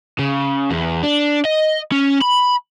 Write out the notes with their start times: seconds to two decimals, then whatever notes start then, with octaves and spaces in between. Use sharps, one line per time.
0.19 C#3
0.71 E2
1.03 D4
1.45 D#5
1.92 C#4
2.21 B5